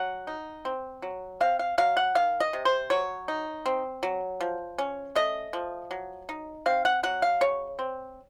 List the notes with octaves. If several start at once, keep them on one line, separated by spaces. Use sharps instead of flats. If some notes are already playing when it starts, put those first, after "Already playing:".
Already playing: F#3 F#5
D#4
C4
F#3
C4 F5
F5
F#3 F5
F#5
D#3 F5
D#5
C3
C5
F#3 C#5
D#4
C4
F#3
F3
C#4
A3 D#5
F3
F#3
D#4
C4 F5
F#5
F#3 F#5
F5
C#3 C#5
C4